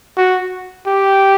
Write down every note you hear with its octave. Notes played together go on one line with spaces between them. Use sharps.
F#4
G4